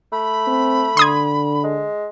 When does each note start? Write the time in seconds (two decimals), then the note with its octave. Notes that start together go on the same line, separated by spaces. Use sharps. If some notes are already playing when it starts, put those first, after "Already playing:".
0.12 A3 B5
0.47 C4
0.97 D3 C6 D#6 G#6
1.64 G#3